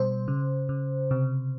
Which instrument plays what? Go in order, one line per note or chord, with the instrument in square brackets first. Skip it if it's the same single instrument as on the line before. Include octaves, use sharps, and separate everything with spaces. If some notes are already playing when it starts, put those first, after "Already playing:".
Already playing: [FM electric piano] B2 G3 C5
C#3
C#3
C3